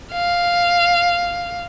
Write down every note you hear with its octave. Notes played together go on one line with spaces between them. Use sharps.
F5